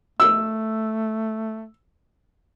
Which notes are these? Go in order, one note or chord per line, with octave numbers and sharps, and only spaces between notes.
A3 E6